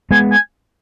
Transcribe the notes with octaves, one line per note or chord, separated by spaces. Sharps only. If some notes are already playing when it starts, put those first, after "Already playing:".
G#3 B3 G#5
G#5